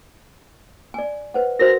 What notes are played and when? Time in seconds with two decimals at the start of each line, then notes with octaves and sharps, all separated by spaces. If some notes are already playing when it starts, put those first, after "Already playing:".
0.94 D5 G#5
1.34 B4 C5 F#5
1.59 F#4 A#4 C5 A#6